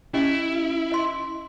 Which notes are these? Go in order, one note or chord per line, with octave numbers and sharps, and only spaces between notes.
C#4 E4 G4 D#5
D#5 C6